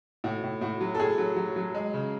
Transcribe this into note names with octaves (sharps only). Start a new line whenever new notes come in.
A2 F#4
A2
A2 F#4
F#3
A4
A2 G#4
F#3
F#3
F#3
G#3
C#3